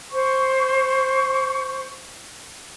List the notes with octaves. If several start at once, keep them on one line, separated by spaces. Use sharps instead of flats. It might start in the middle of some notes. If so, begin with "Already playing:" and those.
C5 C#6